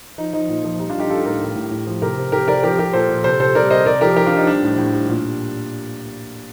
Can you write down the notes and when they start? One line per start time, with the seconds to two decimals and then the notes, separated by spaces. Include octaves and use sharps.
0.18 F3 D#4
0.33 F3 D#4
0.49 A#2
0.64 F3
0.79 G3 D#4
0.90 D4 F4
0.95 G3 D#4 G4
1.10 G3 F4 A4
1.25 A2 G4 A#4
1.41 A2
1.56 A2
1.71 A2
1.87 F3
2.02 C3 G4 A#4
2.17 C3
2.32 C3 G4 A#4
2.48 C3 A#4 D5
2.63 F3 G4 A#4
2.79 F3 G4 A#4
2.93 A#2 A4 C5
3.09 A#2
3.24 C3 A4 C5
3.40 C3 A4 C5
3.55 G3 A#4 D5
3.70 C3 C5 D#5
3.86 C3 A#4 D5
4.01 F3 G4 A#4
4.16 F3 G4 A#4
4.26 D4 F4
4.32 F3 D#4
4.47 G3 D4
4.62 A2
4.78 A2
4.93 G3
5.09 A#2